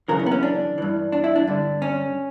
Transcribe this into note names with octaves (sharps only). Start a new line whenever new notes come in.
F#2 C#3 E3 A#4
C#4
B3
C#4
D4
G2 E3
D4
E4
D4
G2 D3
C#4